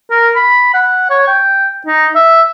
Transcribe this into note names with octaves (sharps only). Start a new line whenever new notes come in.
A#4
B5
F#5
C#5
G5
D#4
E5